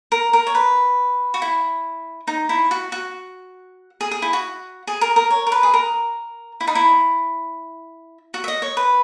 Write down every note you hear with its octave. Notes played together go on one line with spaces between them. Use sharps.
A#4
A#4
C#5
B4
F#4
E4
D#4
E4
F#4
F#4
G#4
G#4
E4
F#4
G#4
A#4
A#4
C#5
A#4
B4
G#4
A#4
E4
D#4
E4
F#4
E5
D#5
C#5
B4